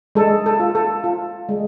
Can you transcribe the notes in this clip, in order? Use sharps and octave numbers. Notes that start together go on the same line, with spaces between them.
G#3 A4
A4
F4
A4
F4
G#3